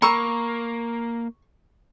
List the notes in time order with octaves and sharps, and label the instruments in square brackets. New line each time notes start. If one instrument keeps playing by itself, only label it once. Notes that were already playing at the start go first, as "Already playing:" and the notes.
[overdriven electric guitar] A#3 [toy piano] A#5 B5 E6 [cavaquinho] C#6